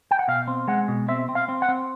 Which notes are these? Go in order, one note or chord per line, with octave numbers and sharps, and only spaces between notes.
G5
F#5
B2 F5
C4
G#3 F#5
B2
C4 E5
C4
F5
C4
F#5
C4